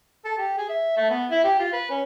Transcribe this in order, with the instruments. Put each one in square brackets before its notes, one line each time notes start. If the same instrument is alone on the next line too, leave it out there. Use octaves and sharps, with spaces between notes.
[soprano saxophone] A4
G4
G#4
E5
A3
B3
E4
G4
F4
B4
C#4